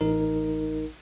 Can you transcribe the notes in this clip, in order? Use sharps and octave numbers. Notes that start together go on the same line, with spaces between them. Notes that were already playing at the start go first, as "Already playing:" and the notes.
A1 D#4 A#4